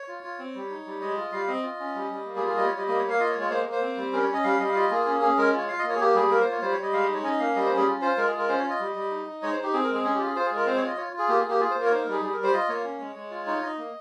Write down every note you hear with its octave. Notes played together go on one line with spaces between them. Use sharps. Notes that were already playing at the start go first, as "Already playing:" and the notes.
Already playing: C#5
F4
F4
C4
G3
D#4
G3
G#3 D#5
F4
G3 F5
C4 D#5
F4
C#4
G3
G3
A#3
G#4
F4
G#4
G3 D#5
G3 C#5
D#5
A#3 D#5
A#3 C#5
F5
F4 D#5
C#5
G#3
C#5
A#3 C5
A#3
C5
C4
G3
C#4 A#4
C#5
C#4
D#5
G3 F5
G3 D#5
F5
F4 D#5
A#3 G#4
C#4 G#4
C#4 G#4
G#3 A#4
F4 C#5
F4 F5
D#5
A#3 C#5
G#4
A#3 G4
G3 G#4
A#3 A#4
F4 C5
C#5
G3 C5
C#5
G3 D#5
G#3 F5
D#5
D#4
C#5
C#4 D#5
A#3 F5
G3 D#5
C#4 C5
G#4
F4
F4 C5
G#3 A#4
G#4
F4
A#4
C#4 C5
F4 C#5
D#5
G3
G3
D#4
D#4
G#3 C#5
D#4 C5
G4
C4 G#4
A#4
G#3
G#4
C#4 G#4
F4 G4
G#4
F4 C5
G#4
G#3 A#4
C4 C5
C#5
F4 D#5
F4 C#5
F4
G#4
A#3 G4
G#4
A#3
G4
F4 G#4
A#3 C5
A#4 C#5
D#4 C5
A#4
G3 G#4
G3 G#4
G3 A#4
C5
F4 D#5
A#3 C#5
C#4
G#3
G#3
F4
D#4 C#5
D#4 D#5
A#3